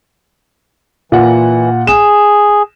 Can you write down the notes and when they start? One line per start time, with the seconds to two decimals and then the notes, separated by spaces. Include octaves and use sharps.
1.12 A#2 E3 F#5
1.87 G#4 E7